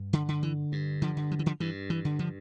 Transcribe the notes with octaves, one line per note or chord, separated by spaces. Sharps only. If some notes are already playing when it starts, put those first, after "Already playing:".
Already playing: G2
D3
D3
E3
G2
D3 F3
D3
F3
E3
D3 F3
G2 E3
E3
D3
D3 F3